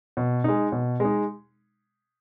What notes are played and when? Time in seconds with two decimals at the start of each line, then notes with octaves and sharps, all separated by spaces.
0.17 B2
0.44 G#3 D#4
0.72 B2
1.00 G#3 D#4